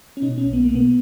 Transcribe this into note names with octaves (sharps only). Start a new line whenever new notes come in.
C#4
B2 D#4
C#4
B1
B3
B2 A#3
B3